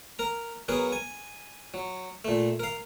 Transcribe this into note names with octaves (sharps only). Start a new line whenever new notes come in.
A#4 A#5
F#3 B3 G#4 A#4
G#5
F#3
A#2 A3
A#4 F5